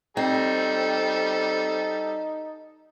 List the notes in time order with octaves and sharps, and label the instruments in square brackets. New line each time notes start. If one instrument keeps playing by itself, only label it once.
[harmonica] G3 A4 [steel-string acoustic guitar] C4 [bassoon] D#4